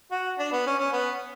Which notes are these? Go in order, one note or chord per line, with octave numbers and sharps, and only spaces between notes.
F#4
D4
B3
C#4
C#4
B3